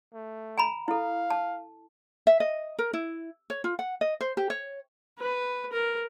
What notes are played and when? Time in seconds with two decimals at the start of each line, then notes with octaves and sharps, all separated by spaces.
0.14 A3
0.58 G#5 A#5 B5
0.88 E4 A4 F5
1.30 A5
2.27 E5
2.40 D#5
2.79 A#4
2.93 E4
3.50 C#5
3.64 F4
3.79 F#5
4.01 D#5
4.21 C5
4.37 G4
4.50 C#5
5.19 B4
5.72 A#4